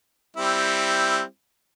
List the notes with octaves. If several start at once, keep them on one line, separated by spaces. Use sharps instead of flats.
G3 C4 E4